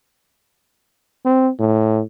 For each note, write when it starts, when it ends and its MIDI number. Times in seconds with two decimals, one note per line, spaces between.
1.25 1.49 60
1.60 2.01 45